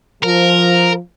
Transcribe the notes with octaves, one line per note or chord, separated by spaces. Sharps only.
F3 A#4